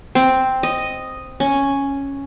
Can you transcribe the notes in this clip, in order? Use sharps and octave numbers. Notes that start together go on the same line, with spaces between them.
C4
D#5
C#4